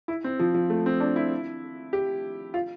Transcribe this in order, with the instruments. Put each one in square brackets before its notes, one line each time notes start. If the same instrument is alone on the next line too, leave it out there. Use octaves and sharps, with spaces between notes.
[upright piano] E4
C4
F3
F3
A3
C4
D4
E4
G4
F4